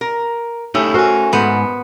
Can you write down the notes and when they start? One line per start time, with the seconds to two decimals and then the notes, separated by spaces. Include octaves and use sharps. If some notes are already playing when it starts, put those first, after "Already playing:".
0.01 A#4
0.75 A3 C#4 D#4 E4 G4
0.94 F#4 A#4 C5 G#5
1.33 G#2 B3 C5